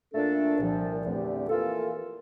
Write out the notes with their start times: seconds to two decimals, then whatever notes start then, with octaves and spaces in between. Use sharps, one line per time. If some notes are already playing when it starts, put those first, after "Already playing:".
0.13 A#2 A3 D4 A4
0.58 C2 A#2 F3
1.03 E2 D3 A3 C4 G4
1.48 E3 A#3 F4 A4